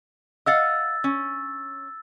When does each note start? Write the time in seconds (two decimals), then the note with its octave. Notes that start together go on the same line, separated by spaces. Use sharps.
0.46 D#5 F5 F#5 E6 A6
1.04 C#4